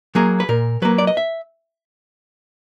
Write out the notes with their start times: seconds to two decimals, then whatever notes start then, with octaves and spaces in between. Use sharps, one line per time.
0.15 F#3 A#3 G#4
0.40 B4
0.49 A#2 A#4
0.82 F#3 A#3 B4
0.98 D5
1.07 D#5
1.17 E5